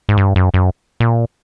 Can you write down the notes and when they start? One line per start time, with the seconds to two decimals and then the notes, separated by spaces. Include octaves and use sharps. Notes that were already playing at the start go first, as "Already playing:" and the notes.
0.09 G#2
0.17 G2
0.36 F#2
0.54 F#2
1.00 A#2